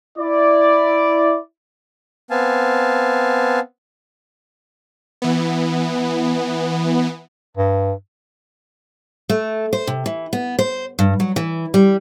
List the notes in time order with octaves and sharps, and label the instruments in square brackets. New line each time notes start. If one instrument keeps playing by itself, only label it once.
[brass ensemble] E4 D5
[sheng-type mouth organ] B3 C4 F5 G#5 A5
[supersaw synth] E3 B3
[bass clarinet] G2
[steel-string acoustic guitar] A3
C5
C3
E3
B3
C5
G2
F#3
E3
G3